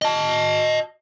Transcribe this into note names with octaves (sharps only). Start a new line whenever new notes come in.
D#5 A5